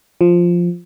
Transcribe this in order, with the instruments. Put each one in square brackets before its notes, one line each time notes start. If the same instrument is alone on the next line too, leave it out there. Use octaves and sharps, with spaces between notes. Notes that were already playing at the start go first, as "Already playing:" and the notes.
[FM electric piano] F3